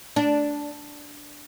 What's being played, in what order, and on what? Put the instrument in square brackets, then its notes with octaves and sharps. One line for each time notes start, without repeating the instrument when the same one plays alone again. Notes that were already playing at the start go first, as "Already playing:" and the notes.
[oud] D4